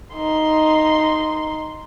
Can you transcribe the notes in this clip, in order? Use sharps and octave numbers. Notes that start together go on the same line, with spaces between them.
D#4 C6